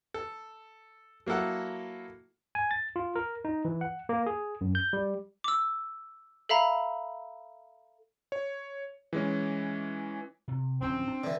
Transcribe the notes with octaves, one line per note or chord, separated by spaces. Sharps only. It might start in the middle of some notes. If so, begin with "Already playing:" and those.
A4
F#3 A#3 E4 A4 F#5
G#5
A6
F4
A#4
D#4
E3
F#5
A#3
G#4
F#2
G6
G3
D6 E6
A4 E5 F5 A#5 B5
C#5
E3 G#3 C#4
C3
D1 F3 C4 C#4
D4
D3 E3